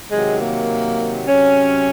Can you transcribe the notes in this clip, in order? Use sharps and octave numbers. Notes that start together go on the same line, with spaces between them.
C3 D#3 F#3 G#3
A#3
C3 F#3 C#4